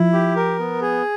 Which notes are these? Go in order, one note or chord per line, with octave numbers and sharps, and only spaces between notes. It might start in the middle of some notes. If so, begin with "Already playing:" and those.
Already playing: F3 E4
G4
A#4
B3
G#4